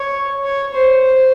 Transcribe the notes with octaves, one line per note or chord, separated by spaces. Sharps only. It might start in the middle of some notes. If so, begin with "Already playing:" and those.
Already playing: C#5
C#5
C5
C5